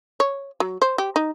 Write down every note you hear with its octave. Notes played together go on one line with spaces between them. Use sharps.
C#5
F#3
C5
G4
D#4